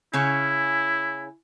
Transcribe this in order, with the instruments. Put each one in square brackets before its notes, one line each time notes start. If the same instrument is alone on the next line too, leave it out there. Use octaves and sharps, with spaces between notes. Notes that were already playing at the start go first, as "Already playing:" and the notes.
[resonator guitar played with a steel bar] C#3 C#4 [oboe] E4